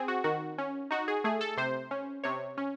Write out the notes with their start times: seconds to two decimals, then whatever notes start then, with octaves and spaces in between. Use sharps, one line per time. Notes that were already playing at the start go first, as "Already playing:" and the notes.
Already playing: C4 G#4
0.08 F#4
0.24 D#3 F#4
0.58 C#4
0.91 D#4 F#4
1.08 G#4
1.24 A3 G#4
1.41 A4
1.57 C3 C5
1.91 C#4
2.24 C3 C#5
2.57 C#4